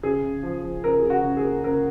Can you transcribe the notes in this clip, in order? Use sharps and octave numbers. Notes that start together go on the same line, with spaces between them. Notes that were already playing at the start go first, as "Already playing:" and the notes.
C#3 G#4
C#3
F3
F3
C#3 A#4
C#3 G#4
F#4
C#3
G#4
A#3
C#3 A#4